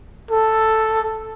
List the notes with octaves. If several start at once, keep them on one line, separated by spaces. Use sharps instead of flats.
A4